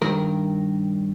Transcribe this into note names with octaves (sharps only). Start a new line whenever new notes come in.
G2 D#3 A#4